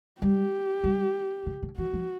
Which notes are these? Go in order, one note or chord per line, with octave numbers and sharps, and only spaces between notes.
G3 G4
G3
C#3
D3
E3 F#4
F3